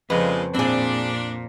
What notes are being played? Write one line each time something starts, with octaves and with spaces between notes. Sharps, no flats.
F2 A#2 C#3 G#3 B4
A#2 C4 D4 G#4 D5 B5